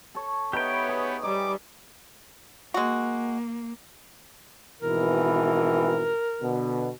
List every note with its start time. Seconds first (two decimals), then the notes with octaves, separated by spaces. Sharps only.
0.15 A4 C#5
0.53 B3 D#4 G4 B4 C#5 E5 G5
0.89 G#4
1.23 G3 D#4 G#5 D6
2.74 G#3 A#3 F#4
4.82 G#1 B2 E3 A#4
6.41 B2 D3